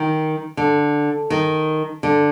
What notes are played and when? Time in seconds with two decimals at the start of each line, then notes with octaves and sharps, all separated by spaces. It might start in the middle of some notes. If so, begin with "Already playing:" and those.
Already playing: D#3
0.57 D3
1.30 D#3
2.03 D3